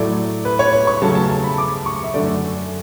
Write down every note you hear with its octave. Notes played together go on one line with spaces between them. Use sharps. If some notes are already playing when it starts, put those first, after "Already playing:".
Already playing: A2 F#3 A3 D5
B4
C#5
B5
C#6
C#3 F#3 A3 A5
A5
A5
B5
D6
C#6
E5
F#2 D3 A3 D5